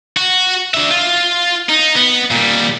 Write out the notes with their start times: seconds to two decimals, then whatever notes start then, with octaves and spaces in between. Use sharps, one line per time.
0.17 F#4
0.74 D4 E5
0.91 F4
1.69 D#4
1.96 B3
2.31 A#2 G3